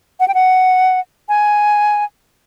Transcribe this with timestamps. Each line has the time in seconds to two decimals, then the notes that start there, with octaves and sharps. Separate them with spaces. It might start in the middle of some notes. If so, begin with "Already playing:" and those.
0.20 F#5
0.28 G5
0.34 F#5
1.29 G#5